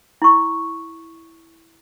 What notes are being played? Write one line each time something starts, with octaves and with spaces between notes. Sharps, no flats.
E4 C#6